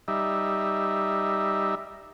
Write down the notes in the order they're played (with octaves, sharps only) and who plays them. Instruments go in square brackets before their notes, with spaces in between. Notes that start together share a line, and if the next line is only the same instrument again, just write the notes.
[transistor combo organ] G3 D#4 E5